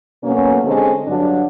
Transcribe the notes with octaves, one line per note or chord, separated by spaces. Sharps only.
B2 F#3 A3 A#3 C#4
D3 G#3 C4 C#4 G4 A4
G2 D3 F#3 D4